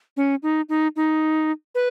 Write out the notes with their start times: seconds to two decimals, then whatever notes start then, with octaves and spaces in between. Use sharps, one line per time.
0.17 C#4
0.43 D#4
0.69 D#4
0.96 D#4
1.75 B4